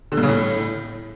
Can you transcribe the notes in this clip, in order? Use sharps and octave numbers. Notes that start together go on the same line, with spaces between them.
D3
G2
C#3
A2